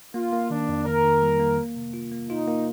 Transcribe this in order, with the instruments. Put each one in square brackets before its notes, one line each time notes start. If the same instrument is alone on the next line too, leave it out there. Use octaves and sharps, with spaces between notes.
[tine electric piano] A#3 [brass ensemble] F4
[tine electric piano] A#3
[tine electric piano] D#3 [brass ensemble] D4
[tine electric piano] F2
[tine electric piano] D#3 [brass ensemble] A#4
[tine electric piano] D#3
G3
A#3
A#3
C3
F4
A#3
[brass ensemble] D#4 [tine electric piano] F4
[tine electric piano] A#3